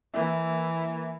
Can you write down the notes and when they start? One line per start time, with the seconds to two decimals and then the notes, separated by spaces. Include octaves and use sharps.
0.14 E3 A#3 E4